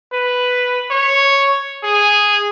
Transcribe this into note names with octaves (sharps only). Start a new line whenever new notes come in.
B4
C#5
G#4